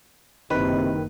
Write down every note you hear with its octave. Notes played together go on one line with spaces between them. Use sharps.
F#1 C3 D#3 E4 B4